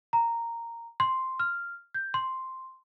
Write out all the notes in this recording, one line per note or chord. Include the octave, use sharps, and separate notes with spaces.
A#5
C6
F6
G6
C6